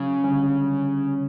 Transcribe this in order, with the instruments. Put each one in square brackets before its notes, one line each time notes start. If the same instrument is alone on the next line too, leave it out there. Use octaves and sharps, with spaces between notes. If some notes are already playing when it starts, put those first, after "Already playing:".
Already playing: [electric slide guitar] C#3 [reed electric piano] F#3 C#4
[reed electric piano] D3 G3 C#4